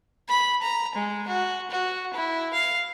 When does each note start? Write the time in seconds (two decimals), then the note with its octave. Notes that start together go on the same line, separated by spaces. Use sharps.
0.29 B5
0.62 A#5
0.95 G#3
1.27 F#4
1.70 F#4
2.13 E4
2.53 F5